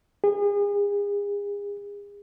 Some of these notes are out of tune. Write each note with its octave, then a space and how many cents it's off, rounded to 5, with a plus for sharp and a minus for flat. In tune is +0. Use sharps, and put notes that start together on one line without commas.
G#4 -35